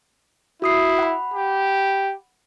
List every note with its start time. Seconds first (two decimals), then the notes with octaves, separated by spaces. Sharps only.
0.62 E4 F#4 D#6 C7
0.98 F#5 B5
1.34 G4